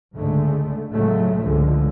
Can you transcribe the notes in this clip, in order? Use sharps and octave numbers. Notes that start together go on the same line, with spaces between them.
C#2 G#2 D3 G#3 A3
A2 C#3 F3 F#3 G#3 A3
C#2 G#2 D3 F3 G#3